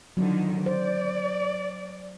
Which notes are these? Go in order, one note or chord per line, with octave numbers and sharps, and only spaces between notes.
D3 D#3 F3 F#3
C5 D5